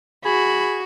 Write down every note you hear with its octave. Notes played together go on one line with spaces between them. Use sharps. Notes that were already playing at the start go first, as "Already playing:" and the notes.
F#4 G#4 B5